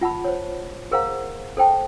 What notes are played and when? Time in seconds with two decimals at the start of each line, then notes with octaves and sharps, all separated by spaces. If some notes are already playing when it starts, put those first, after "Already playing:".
0.01 F4 F#5 A5 B5
0.25 C5 C#5
0.91 G#4 A#4 C5 F5 F#5 A#5
1.57 A4 C5 G5 A5